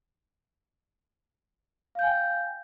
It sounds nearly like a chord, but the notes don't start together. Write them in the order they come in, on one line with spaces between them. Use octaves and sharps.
F5 G6 G#5 G5